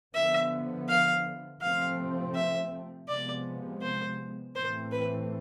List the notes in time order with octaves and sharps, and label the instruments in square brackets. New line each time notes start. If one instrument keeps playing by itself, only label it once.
[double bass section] D3 F3 B3 [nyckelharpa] E5
[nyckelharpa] F5
[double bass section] C3 F3 A3 C4 [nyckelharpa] F5
[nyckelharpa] E5
[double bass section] C3 F3 G#3 B3 [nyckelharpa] D5
[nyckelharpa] C5
[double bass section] A2 E3 A3 C4 [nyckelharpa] C5
[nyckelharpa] B4